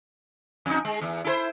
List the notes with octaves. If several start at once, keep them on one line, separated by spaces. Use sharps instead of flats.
F2 D#4
G#3
E2
E4 A4 C5